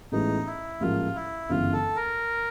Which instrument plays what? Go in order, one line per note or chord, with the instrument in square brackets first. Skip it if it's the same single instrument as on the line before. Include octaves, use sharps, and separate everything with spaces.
[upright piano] A1 A2 E3 G#3 B3 [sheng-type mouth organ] D#4
[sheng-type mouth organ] E4
[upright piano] A1 G#2 F3 A#3 [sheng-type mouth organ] F4
[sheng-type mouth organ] E4
[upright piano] G1 F#2 C#3 E3 [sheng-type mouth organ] F4
[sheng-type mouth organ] A4
A#4